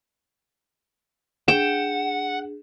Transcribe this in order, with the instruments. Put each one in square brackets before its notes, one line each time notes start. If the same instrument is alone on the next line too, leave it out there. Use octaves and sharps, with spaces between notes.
[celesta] D4 G#4 [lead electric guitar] F#5 [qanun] G5 [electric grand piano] E7